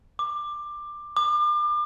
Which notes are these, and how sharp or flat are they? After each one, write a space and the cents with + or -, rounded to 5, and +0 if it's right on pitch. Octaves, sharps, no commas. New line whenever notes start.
D6 +15
D6 +35